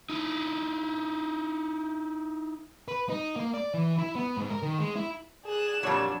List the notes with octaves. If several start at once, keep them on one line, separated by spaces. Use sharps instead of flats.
D#4 E4
B4
D#4
A#3
D5
E3
E4
B3
G#2
A#4
D#3
G#3
E4
G#4 D5 F#6 E7
F2 A#2 F#3 G3 D4 C#5